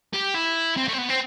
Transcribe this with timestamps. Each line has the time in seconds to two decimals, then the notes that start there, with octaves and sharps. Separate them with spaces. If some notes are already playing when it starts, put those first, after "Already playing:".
0.14 G4
0.35 E4
0.77 C4
0.88 A3
0.93 C4
0.98 B3
1.09 C4